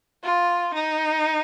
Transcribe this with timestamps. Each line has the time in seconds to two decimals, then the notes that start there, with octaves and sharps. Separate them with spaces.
0.24 F4
0.74 D#4